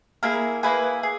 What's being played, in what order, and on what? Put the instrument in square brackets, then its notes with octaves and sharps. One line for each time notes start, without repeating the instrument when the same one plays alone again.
[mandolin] A#3 E4 G#4 A#4
A#3 E4 G#4 B4
G#4